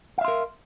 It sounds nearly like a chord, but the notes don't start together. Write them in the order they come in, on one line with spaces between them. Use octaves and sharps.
F5 E5 C6 A#4